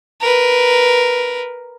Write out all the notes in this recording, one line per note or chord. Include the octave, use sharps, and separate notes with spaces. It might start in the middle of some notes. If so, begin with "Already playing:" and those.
A#4 B4